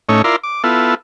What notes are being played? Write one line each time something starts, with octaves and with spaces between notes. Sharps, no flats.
A2 A3 C#4 D#4 C#5
E4 F4 A#4 D5 C6
D6
B3 E4 F4 A4